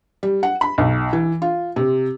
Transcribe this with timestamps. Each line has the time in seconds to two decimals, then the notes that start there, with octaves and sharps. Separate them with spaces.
0.23 G3
0.43 F#5
0.61 B5
0.78 B1
1.13 E3
1.42 F4
1.76 C3